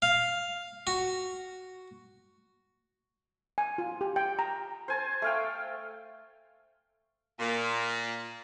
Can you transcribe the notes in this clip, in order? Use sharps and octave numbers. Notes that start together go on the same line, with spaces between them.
F5
F#4
G#5
F4
G4
G5
A#5
C5 G#5 A5
A3 F5 G5
A#2